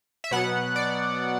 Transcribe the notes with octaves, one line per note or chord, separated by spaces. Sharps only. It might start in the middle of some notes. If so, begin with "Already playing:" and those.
E5
B2 F#3 B3 F#5
D5